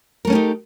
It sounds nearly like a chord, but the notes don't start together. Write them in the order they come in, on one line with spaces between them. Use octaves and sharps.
A#4 A3 C#4 G4 D#4